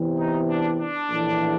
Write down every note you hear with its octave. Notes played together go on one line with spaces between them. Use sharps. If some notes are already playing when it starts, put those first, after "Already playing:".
Already playing: E2 C3 E3
D#4
D4
D4
A#1 A2 E3